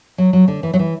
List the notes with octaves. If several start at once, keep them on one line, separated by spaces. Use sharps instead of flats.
F#3
F#3
D3
E3
F#3
E3